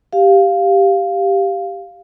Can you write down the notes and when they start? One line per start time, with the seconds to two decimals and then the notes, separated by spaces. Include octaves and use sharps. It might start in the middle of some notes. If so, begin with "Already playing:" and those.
0.13 G4 F5